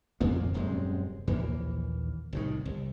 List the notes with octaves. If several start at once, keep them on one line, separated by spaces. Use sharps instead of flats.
G#1 F2 A#2 A#3
D#1 F#2 C3 G#3
A#1 D#2 E3 A#3
C2 A2 D#3
C2